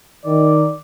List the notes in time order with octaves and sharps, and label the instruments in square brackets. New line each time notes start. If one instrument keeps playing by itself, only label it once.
[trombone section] D#3 [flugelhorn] D5